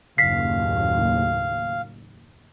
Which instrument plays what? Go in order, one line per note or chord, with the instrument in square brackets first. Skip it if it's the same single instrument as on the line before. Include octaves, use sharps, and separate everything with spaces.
[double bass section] F#1 D#2 A2 [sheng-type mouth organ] F5 [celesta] B6 C7